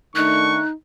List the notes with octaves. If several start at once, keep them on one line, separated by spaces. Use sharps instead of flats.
D#3 A3 D4 D#4 C#6 F#6